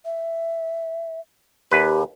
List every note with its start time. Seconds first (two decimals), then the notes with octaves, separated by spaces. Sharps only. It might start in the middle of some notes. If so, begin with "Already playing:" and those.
0.05 E5
1.72 D#2 G4 B4